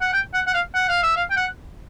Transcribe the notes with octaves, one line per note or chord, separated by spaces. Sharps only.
F#5
G5
F#5
F#5
F5
F#5
F5
E5
F5
G5
F#5